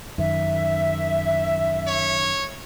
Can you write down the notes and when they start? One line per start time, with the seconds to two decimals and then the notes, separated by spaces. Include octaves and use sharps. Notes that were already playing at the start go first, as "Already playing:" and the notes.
0.18 F#2 D#3 E5
1.87 C#5